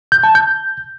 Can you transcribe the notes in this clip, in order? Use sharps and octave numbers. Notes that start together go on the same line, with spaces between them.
G6
A5
G6